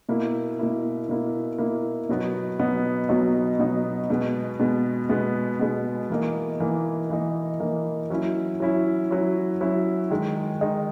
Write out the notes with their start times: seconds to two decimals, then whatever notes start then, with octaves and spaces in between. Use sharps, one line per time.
0.09 B2 A#3 E4
0.59 B2 A#3 E4
1.09 B2 A#3 E4
1.58 B2 A#3 E4
2.09 B2 F#3 B3 D#4
2.59 B2 F#3 B3 D#4
3.09 B2 F#3 B3 D#4
3.59 B2 F#3 B3 D#4
4.10 B2 G#3 B3
4.59 B2 G#3 B3
5.09 B2 G#3 B3
5.60 B2 G#3 B3
6.10 E3 A#3 D#4
6.60 E3 A#3 D#4
7.10 E3 A#3 D#4
7.60 E3 A#3 D#4
8.10 F#3 C#4 E4
8.60 F#3 C#4 E4
9.10 F#3 C#4 E4
9.61 F#3 C#4 E4
10.10 D#3 G#3 D#4
10.61 D#3 G#3 D#4